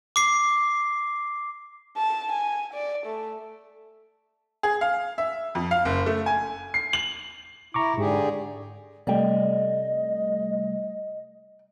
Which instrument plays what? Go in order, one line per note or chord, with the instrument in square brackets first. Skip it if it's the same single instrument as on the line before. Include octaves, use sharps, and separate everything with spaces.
[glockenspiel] D6 C7
[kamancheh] A5
G#5
D5
A3
[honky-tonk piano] G#4
F5
E5
F2
F5
F#1
A3
G#5
C7
F#7
[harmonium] E4 [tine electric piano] A#5 C#6 D6
[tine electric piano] G#2 [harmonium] D3 G4 G#4
[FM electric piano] C3 G3 A3 [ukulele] D5 G5 [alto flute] D#5